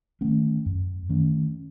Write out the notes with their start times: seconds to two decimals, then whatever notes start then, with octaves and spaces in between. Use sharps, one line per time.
0.21 D#3 A3 C#4
0.66 F#2
1.09 D#3 A3 C#4